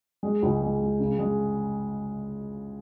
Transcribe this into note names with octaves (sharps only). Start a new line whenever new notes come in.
G#3
C#2
G#3
G#3
C#3
G#3